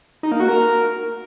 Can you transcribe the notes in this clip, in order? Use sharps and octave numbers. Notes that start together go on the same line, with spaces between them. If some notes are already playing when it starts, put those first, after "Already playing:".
D#4
A#3
F#4
A#4